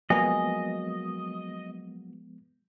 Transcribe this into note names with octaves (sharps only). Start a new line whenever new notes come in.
F3 F#3 G#3 A#3 B3 D#5 G#5